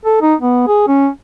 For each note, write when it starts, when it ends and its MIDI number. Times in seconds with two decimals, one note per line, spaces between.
0.05 0.21 69
0.22 0.35 63
0.40 0.64 59
0.67 0.84 68
0.88 1.08 61